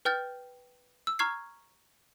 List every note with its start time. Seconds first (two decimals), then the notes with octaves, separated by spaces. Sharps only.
0.05 B4 G5 F6 G6 A6
1.07 E6
1.19 A#5 C#6 F6 G#6 C7